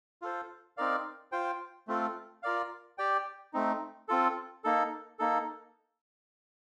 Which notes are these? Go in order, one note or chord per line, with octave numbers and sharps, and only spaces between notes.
F4 A4 C5
C4 D#4 A#4 D5 F5
F4 C5 G5
A3 C4 F4 A4
F4 A#4 D5 F5
G4 D5 G5
A3 C4 D#4
C4 F4 A4
A#3 D#4 A4
A#3 D#4 A4